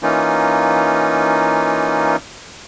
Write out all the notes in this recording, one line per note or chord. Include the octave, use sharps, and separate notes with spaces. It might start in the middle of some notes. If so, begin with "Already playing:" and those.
E3 A#3 C#4 D#4 F4